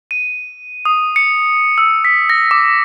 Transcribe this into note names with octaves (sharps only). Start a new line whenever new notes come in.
D#7
D#6
C#7
E6
B6
A#6
D6